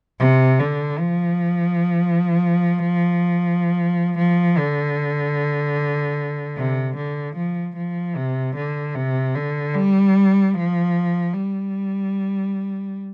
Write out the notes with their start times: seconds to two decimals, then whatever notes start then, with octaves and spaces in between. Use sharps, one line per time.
0.19 C3
0.59 D3
0.99 F3
4.18 F3
4.58 D3
6.57 C3
6.96 D3
7.36 F3
7.76 F3
8.16 C3
8.55 D3
8.95 C3
9.35 D3
9.74 G3
10.54 F3
11.34 G3